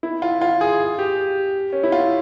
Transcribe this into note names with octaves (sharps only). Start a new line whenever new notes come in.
E4
F4
F4
G#4
G4
C#4
E4
F4